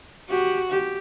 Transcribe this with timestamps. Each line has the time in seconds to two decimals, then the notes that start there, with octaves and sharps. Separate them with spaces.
0.30 F#4 G4
0.70 G4